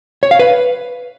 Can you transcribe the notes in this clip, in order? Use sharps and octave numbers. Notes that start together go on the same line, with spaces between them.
C#5
F5
B4